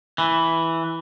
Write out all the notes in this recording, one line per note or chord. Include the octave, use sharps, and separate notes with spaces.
E3